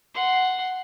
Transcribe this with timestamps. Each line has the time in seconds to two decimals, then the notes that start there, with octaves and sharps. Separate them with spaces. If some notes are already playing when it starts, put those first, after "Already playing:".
0.14 F#5 C6